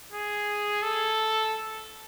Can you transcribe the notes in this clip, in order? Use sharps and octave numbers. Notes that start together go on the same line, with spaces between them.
G#4
A4